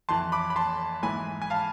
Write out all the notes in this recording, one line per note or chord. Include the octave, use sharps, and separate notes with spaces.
F2 E3 A5 C6
B5 D6
B5
A5 C6
G#2 E3 G#5 B5
G#5
F5 A5